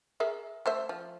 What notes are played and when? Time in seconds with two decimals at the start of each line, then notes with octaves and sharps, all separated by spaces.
0.20 G#4 A#4 E5
0.66 A3 C5 E5
0.89 F3